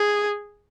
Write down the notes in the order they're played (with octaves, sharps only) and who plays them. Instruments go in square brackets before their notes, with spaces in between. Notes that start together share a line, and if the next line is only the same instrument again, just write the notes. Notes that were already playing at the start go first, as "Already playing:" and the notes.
Already playing: [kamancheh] G#4